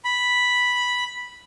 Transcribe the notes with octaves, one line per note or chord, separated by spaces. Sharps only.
B5